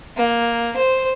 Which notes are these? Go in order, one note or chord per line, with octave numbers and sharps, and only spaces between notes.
A#3
C5